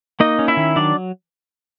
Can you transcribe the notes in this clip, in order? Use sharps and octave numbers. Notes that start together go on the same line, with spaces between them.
A#3 D#4 D#5
C#4
E4 E5
D#3
F#3 D4 D5